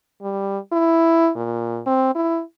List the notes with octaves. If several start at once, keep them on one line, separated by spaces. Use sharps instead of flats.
G3
E4
A#2
C4
E4